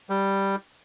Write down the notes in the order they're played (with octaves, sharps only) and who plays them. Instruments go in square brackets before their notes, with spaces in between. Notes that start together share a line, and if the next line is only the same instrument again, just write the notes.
[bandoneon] G3